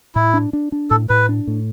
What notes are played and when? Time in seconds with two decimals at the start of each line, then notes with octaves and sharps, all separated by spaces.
0.15 A2 E4
0.34 D4
0.53 D4
0.72 D4
0.90 A2 A4
1.09 A2 B4
1.29 D4
1.47 A2